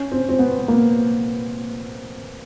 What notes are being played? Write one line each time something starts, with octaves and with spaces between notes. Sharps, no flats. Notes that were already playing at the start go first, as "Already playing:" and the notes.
Already playing: C#4
C4
C4
B3
A#3